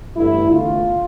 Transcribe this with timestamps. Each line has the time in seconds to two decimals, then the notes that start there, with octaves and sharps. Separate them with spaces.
0.16 A1 G2 D3 E4
0.52 E2 D3 A3 F4